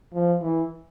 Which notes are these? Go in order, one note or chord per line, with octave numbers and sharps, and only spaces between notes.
F3
E3